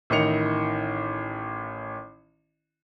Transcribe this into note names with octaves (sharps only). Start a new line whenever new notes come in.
A1 D#3 E4 D#5 C#7 F7